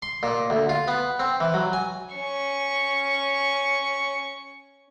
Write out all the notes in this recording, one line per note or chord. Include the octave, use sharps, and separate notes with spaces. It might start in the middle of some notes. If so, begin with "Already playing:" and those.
C6
A#2
D2
F4
B3
C4
E3
F#3
G#5
C#4 C#6